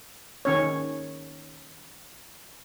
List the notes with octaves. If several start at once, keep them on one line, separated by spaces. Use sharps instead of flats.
D#3 C#4 C#5